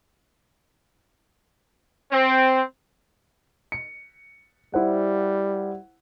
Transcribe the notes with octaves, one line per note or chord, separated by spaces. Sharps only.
C4
C#7
G3 E4 C5 F#5